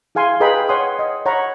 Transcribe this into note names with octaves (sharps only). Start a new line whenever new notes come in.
E4 G#4 F5 G#5 C6
G#4 B4 D#5 G5 A#5 B5
C#5 F#5 G#5 C6 D#6
D#5
C#5 F#5 A#5 B5 C#6